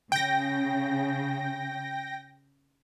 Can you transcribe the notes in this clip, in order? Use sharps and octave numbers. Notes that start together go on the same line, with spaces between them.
C#3 G5 A#6